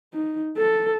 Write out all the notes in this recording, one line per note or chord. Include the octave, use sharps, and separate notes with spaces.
D#4
A4